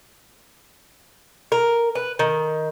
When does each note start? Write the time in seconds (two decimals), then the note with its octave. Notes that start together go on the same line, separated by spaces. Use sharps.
1.52 A#4
1.95 B4
2.19 D#3